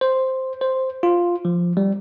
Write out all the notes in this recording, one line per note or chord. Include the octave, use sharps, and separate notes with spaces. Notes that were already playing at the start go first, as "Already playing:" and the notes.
C5
C5
F4
F3
G3